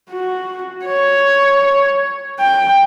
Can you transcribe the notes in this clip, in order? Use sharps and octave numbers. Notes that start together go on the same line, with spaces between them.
F#4
C#5
G5